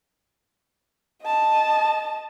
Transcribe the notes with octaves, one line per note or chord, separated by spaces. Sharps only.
D#5 A5